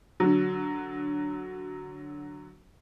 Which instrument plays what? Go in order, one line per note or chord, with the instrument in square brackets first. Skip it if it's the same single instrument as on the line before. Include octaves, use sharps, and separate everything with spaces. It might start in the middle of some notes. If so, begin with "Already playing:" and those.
[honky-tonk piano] D3 F#3